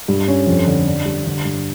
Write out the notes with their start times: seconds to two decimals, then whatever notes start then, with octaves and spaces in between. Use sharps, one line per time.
0.08 G2
0.28 C#4
0.47 F2
0.67 D3
0.87 D4
1.05 G3
1.26 D3
1.45 G2